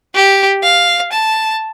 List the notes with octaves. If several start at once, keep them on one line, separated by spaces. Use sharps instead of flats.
G4
F5
A5